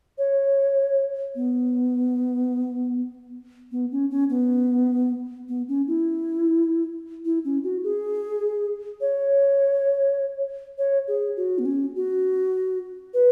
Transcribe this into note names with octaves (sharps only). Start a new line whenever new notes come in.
C#5
B3
B3
C#4
C#4
B3
B3
C#4
E4
E4
C#4
F#4
G#4
C#5
C#5
G#4
F#4
B3
C#4
F#4
B4